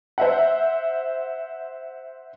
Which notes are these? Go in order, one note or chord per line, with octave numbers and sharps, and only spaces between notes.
C5 E5 F#5